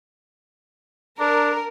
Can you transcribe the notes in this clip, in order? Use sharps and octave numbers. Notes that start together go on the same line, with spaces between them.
D4 A#4